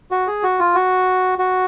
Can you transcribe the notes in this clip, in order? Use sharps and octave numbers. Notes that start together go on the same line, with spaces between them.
F#4
G#4
F#4
F4
F#4
F#4